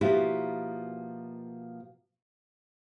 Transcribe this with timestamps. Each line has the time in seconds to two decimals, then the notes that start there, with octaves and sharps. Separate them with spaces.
0.01 B2 F3 A#3 E4 F#4 G4